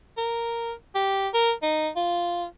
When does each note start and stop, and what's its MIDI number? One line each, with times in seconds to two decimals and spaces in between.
0.17 0.73 70
0.95 1.28 67
1.34 1.52 70
1.62 1.89 63
1.96 2.46 65